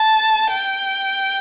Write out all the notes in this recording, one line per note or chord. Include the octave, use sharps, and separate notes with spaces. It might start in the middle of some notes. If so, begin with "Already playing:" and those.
Already playing: A5
G5